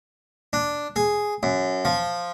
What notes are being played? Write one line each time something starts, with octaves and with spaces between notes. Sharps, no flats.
D4
G#4
F#2
F3